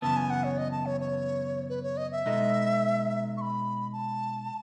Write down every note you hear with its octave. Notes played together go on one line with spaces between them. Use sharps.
F#2 C#3 E3 B3 A5
G#5
F#5
C#5
D#5
A5
C#5
C#5
B4
C#5
D#5
E5
B2 G#3 D#4 A4 D#5
C#6
B5
A5